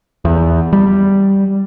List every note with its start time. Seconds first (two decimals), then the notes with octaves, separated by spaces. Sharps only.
0.25 E2
0.73 G3